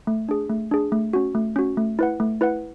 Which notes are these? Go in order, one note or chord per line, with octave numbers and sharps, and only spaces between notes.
A3
D4 G#4
A3
D4 G#4
A3
C#4 F#4
A3
C#4 F#4
A3
E4 B4 F#5
A3
E4 B4 F#5